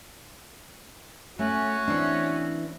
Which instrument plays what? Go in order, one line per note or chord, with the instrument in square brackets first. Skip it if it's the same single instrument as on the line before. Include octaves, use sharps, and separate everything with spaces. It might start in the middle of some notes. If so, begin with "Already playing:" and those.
[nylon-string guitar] A3 [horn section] C#4 [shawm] F#4
[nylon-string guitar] E3 C4 D4